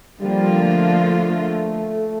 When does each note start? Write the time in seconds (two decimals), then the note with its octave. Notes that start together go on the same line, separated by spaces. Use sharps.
0.20 D3 F3 G3 A#3 F4
0.62 A3